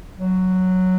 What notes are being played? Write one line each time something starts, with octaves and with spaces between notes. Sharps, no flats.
F#3